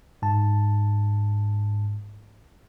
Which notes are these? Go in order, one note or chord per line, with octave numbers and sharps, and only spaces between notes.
G#2 A5